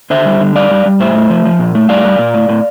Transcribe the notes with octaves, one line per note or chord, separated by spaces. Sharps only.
D3 C5 E5
G3
D3
G3 D5 F5
G3
G3
A2 C5 E5
A3
F3
F3
A#2
A3
G3 D5 F5
G3
A#2
A2
A2